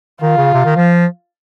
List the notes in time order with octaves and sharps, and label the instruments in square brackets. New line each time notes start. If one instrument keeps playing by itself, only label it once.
[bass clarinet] D#3 [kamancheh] F4
[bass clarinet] C#3
C3
D#3
F3